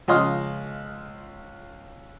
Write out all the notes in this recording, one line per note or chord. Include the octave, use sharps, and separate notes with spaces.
C#2 F3 D#5 F5 C6 D#6